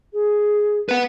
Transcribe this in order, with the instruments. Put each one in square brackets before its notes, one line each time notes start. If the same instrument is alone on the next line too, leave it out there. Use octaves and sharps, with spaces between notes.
[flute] G#4
[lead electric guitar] B4 F#5